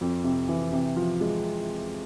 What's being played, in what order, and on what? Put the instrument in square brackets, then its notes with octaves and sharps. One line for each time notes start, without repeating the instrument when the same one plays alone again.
[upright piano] F2
C3
E3
C3
F3
G#3